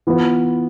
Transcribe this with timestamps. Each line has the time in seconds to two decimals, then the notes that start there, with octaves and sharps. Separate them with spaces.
0.07 E3 B3 F4 B4